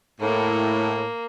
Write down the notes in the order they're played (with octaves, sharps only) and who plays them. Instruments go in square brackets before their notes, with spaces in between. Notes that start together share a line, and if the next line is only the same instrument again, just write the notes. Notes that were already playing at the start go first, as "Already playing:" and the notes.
[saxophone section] A2 [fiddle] A#3